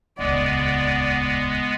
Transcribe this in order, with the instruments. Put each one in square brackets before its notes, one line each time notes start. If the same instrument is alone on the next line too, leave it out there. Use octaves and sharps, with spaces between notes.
[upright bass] D#1 C#2 [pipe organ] G#3 B3 [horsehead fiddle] D5